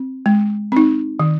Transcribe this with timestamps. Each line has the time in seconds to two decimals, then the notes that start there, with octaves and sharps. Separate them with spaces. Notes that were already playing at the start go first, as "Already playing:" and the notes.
Already playing: C4
0.26 G#3
0.72 C4 D#4
1.19 D#3